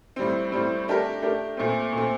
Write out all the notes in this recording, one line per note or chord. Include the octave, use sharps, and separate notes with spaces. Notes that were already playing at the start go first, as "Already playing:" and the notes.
A2 G3 C4
A2 G3 C4
A3 D4 G4 A#4
A3 D4 G4 A#4
A#2 A3 C4
A#2 A3 C4